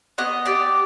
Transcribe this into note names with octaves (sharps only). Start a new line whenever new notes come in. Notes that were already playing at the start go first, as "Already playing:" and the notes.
B3 D#5
G4 D5